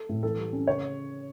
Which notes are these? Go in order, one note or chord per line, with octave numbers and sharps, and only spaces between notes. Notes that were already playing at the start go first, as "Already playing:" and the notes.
Already playing: A4
A2
E3 A4
G3
C#4
C#3 C#5